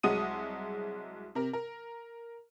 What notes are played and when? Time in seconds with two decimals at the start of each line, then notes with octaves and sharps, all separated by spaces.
0.03 C2 F#3 G#3 F#5 D#6 D#7
1.35 C3 A#4
1.53 A#4